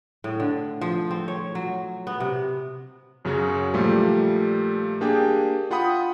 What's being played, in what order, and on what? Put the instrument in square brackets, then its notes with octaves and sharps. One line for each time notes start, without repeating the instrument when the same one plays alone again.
[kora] A2
D3
F3
C4
C#5
F#3
B3
C3
[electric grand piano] F#2 C#3 F#3 C#4 F#4
A#2 F3 G3 A3
A#3 D4 G4 G#4 G5
F4 F#5 G5 B5 D#6